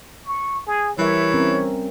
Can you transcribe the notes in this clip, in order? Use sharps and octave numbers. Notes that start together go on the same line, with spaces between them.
C#6
G#4
E3 G3 A#4 C#5 E5
C4 C#4 A#4